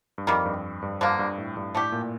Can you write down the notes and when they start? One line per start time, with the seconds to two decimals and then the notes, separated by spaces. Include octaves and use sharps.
0.18 G2
0.27 F2 D#3 G3 A#3
0.45 G2
0.82 G2
1.01 G2 D3 F3 A#3
1.19 G2
1.38 A2
1.57 G2
1.75 A2 A3 D4 G4
1.92 A#2